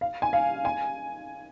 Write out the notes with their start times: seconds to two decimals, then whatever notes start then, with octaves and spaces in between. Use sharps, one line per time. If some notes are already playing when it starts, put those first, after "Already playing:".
0.01 F5
0.22 G#5
0.33 F5
0.65 G#5